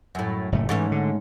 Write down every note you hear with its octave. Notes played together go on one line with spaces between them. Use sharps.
F#2 A2
F#1 A2 A3
G#2 E3 A3 C#4
D3